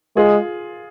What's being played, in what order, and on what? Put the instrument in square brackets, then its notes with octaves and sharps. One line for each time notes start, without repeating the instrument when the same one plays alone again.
[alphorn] G#3 [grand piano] F4 G#4